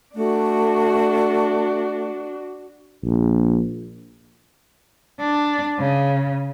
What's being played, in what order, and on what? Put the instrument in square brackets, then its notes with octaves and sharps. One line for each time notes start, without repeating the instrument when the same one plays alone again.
[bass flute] A3 [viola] D4 F#4
[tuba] A#1
[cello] D4
C#3